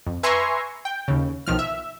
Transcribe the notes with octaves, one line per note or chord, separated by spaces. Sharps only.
F2
B4 E5 G#5 A#5 C6 C#6
G5
D#2 C#3
B1 D#3 F3 F6
E5